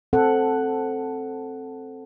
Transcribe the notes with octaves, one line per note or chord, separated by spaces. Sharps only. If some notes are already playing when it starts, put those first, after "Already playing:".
C4 A4 F#5